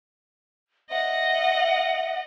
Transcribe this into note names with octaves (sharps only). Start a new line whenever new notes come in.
D#5 E5 F#5